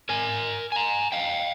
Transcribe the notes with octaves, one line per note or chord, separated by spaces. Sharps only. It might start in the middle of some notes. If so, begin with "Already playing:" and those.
A#4 G#5
G#5 A#5
F5 G5